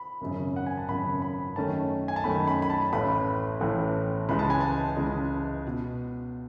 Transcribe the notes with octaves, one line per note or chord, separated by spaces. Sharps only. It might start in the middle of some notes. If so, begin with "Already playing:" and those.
Already playing: B5
G#1 F#2 C#3
F#5
G#5
A5
G#1 F#2 C#3 B5
B5
F#2 D#3 A3 C#4 A5
G#5
A5
F#2 D#3 A3 C#4 B5
B5
B5
A5
A1 A2 E3 B5
A1 A2 E3
C#2 C#3 E3 G#3 B5
A5
G#5
A5
C#2 C#3 E3 G#3
B2